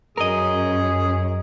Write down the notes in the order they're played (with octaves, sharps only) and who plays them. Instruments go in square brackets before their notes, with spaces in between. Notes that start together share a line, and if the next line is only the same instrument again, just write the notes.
[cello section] F#2 C#4 [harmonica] G#4 [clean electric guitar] A#4 D#5